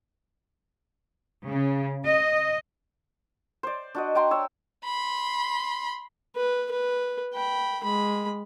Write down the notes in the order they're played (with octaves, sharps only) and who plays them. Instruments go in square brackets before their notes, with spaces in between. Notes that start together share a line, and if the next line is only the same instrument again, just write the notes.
[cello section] C#3
D#5
[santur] C5 D5
D4 F#4 D#5
D5 G5 A#5 C6
C#5 E6
[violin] B5 C6
[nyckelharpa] B4
B4
G5 B5
G#3 B5